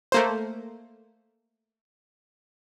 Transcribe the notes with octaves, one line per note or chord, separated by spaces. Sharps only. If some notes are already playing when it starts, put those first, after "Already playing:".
A3 A#3 C5